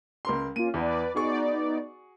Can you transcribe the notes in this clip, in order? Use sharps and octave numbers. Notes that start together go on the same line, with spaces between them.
C#2 A#4 C6
A#3 C#4 F4 D#7
E2 B4 D5
B3 D#4 F#4 G#4 D5 C#6